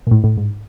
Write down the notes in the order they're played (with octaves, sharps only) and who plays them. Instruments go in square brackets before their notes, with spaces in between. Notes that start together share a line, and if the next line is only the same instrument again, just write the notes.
[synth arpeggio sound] A#2
A2
A2
G#2